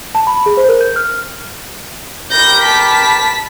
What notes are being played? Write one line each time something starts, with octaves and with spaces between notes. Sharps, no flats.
A5
B5
G#4
C5
A#4
G6
F6
G4 A#4 B5 G6 A#6
A5 B6